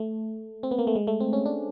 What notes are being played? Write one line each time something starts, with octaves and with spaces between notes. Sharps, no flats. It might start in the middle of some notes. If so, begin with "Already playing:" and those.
Already playing: A3
C4
B3
A#3
A3
G#3
A3
C4
C#4
D4